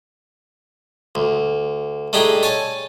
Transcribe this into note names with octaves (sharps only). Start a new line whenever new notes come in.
D2
A3 D4 D#4 G4 G#4
C#5 G#5 A5